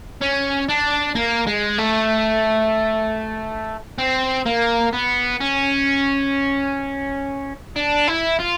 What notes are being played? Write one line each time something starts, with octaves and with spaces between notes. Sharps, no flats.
C#4
D4
A#3
G#3
A3
C4
A#3
B3
C#4
D4
E4
F4